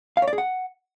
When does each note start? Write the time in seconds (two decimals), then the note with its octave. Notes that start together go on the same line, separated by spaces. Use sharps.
0.17 F5
0.22 C#5
0.28 D5
0.33 G#4
0.38 F#5